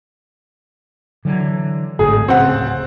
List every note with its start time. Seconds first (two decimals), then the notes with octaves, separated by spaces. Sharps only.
1.25 D3 E3 F#3
1.99 G#1 A2 D3 G#4
2.28 D1 C#3 C4 F#5